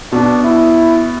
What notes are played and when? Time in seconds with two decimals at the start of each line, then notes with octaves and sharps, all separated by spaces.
0.12 B2 D4
0.44 E4